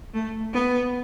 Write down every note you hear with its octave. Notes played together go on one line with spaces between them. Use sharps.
A3
B3